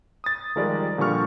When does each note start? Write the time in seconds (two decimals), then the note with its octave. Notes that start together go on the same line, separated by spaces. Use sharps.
0.24 D#6 A6
0.56 D#3 F3 G3 G#3 A#4 D5
0.98 A#2 D3 F3 G3 C#6 F6